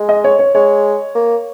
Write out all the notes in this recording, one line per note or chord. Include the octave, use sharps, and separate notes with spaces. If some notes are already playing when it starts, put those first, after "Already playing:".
Already playing: G#3
D#5
C#5
C#5
G#3 C#5
A#3